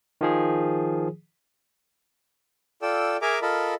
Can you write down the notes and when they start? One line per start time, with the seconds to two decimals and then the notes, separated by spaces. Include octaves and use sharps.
0.21 D#3 F3 G#4
2.82 F4 A4 D5 G5 E6
3.22 G#4 A#4 E5 G#5 A#5 D6
3.42 F4 A4 A#4 D#5 A5 B5